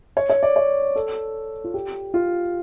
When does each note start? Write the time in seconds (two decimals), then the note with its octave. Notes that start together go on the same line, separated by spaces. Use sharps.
0.17 C#5
0.30 C#5
0.43 D5
0.56 C#5
0.96 A4
1.64 F4
1.74 G4
2.14 F4